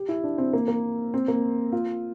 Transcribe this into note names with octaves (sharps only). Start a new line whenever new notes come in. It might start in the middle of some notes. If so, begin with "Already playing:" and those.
Already playing: G4
E4
D4
C4
A#3
A#3
C4
A#3
F4